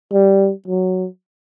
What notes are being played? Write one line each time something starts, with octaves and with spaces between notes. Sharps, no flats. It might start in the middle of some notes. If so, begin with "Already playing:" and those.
G3
F#3